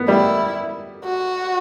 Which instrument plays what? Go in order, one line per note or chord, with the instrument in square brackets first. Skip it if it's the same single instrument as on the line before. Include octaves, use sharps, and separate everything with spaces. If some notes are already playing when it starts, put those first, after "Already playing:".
Already playing: [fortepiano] B3
[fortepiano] G3 [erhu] E4
[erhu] F#4